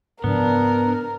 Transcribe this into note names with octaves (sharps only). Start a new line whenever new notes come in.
G#2 C#3 F3 B3 D4 A#4